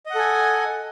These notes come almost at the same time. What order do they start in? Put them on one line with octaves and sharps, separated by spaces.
D#5 F#5 A4 G#5